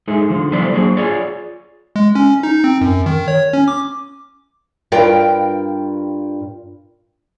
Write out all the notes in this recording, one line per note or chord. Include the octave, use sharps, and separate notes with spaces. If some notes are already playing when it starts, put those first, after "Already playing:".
G#3 A3 D#4 G#4
D3 F3
G3 A3 B3 E4 C5 D5
F#3 A#3 D4 G#4 C5
F4 G#4 C#5 D5
G#3
C#4
D#4
C4
F#2
D#3
C#5
C#4
D6
G2 F4 A#4 G5